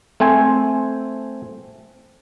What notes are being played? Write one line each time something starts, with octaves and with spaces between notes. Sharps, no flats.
A3 C4 C5 G#5